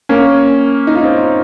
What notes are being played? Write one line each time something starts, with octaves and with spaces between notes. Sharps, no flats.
A#3 C#4
D#4
F4
C4 D#4